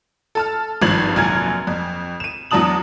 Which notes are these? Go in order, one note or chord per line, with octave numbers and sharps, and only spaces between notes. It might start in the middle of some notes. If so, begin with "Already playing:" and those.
A4 A5 F6
G#1 G2 F3 G#6 F#7
F1 A#1 F#3 G#5 F6 G#6
F2
D#7 E7
E2 F#3 D4 A5 D#6 F#7